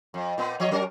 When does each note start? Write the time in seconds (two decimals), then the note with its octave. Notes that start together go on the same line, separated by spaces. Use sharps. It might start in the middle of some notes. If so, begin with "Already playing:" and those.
0.14 F2
0.38 A#2 B3
0.60 F3 C#5 D#5
0.71 F#3 C#4 A#4